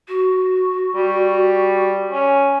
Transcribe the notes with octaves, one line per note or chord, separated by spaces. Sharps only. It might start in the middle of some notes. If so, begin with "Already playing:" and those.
F#4
G3
C#4